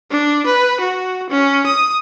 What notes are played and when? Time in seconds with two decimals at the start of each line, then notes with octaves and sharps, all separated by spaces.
0.11 D4
0.46 B4
0.81 F#4
1.30 C#4
1.66 D#6